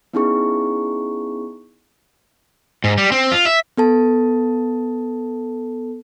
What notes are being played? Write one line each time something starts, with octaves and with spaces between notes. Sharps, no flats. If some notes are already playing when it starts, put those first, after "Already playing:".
B3 C#4 D#4 E4 G#4 C#6
G#2
G3
C4
F4
E5
B3 A4 A5